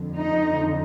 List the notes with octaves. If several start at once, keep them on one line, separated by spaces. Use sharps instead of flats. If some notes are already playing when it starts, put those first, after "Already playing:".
Already playing: F2 D3 F3
D#4